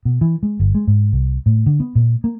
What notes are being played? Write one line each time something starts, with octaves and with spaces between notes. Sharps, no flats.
B2
E3
G#3
G1
G#3
G#2
C2
A2
D3
B3
A#2
A#3